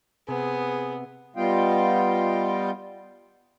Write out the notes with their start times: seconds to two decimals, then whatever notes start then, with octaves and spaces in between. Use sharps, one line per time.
0.28 C3 B3 G#4
1.36 G3 B3 F4 D#5 F5 G5